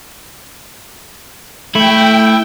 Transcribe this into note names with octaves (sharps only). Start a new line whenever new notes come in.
A3 E4 G5